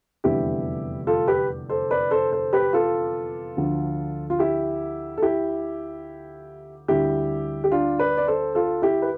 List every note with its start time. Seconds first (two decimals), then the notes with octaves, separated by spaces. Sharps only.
0.24 F1 E2 D3 G3 E4 G4
1.07 F4 A4
1.28 G4 B4
1.69 A4 C5
1.91 B4 D5
2.11 A4 C5
2.32 A4 C5
2.53 G4 B4
2.73 F4 A4
3.57 D2 D3 F3
4.30 F4
4.39 E4 G4
5.18 A4
5.22 E4 G4
6.88 D2 D3 G3 E4 G4
7.64 G4
7.71 D4 F4
7.99 B4 D5
8.17 D5
8.27 A4 C5
8.55 F4 A4
8.82 E4 G4
9.02 B4